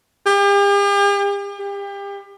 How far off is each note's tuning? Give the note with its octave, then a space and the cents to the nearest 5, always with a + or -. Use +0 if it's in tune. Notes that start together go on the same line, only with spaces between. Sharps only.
G4 +45
G4 +30